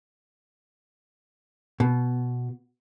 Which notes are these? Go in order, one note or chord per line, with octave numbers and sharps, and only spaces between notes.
B2